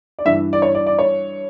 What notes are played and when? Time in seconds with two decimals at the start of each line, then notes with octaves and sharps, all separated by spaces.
0.19 D5
0.25 G2 E3 E5
0.53 D5
0.62 C#5
0.75 D5
0.87 D5
0.99 C#5